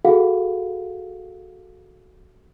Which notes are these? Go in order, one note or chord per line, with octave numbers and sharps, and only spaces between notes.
F#4 G#4 A4 F5 F#5